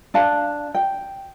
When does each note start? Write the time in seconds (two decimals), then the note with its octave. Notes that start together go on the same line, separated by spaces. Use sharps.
0.14 D4 F5 A5
0.75 G5